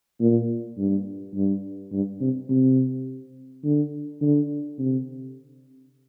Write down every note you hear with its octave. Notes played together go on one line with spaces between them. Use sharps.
A#2
G2
G2
G2
C3
C3
D3
D3
C3